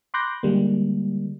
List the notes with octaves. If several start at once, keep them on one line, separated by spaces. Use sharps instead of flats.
B5 C6 D6 F#6 G6 A#6
D3 G3 G#3 A#3